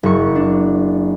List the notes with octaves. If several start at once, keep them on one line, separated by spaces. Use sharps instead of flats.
F#1 C#6
D4